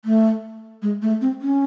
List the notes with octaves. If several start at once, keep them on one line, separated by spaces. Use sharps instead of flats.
A3
G#3
A3
C4
C#4